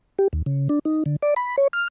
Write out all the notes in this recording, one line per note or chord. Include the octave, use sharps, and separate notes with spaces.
G4
D#2
C#3
D4
D#4
D3
D5
B5
C#5
F6